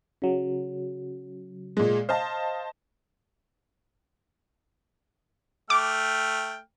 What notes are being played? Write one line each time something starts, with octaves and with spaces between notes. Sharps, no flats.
C#3 F#3
A#2 G#3
C5 D#5 F5 A5
A3 G5 D6 F6